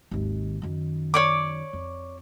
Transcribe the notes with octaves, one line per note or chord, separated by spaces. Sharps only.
G#1 D#2
F#2 D#3
C#5 D5 D6
F2